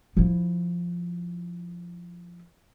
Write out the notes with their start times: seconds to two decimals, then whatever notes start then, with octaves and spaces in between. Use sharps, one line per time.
0.17 F3 E4